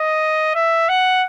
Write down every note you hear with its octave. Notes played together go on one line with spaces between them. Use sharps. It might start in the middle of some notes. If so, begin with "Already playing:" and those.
Already playing: D#5
E5
F#5